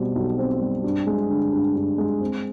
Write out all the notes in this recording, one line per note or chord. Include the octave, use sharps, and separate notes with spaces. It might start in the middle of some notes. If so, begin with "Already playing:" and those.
Already playing: B2 G3 C4
B1
C4
G3
G2
G#3
D3
G2
G2
G#3
C4